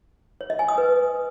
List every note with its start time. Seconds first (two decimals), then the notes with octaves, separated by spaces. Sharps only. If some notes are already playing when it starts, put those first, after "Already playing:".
0.41 C#5
0.50 D#5
0.59 G#5
0.68 D#6
0.78 B4